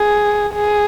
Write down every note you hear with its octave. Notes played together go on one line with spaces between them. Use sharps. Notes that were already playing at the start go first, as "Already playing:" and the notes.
Already playing: G#4
G#4